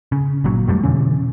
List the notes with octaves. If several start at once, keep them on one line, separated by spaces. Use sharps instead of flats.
C#3
G1 A#2 F#3
F2 F#3 G3 A3
B2 D3 E3 C#4